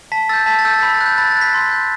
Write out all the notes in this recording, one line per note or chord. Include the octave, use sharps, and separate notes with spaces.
A5 B6
E6 G6 A6
A5 B6
A6
E6 G6
A6
B5 B6
A6
F#6
G6
B5 A6
F#6 A6
B6
C6
G6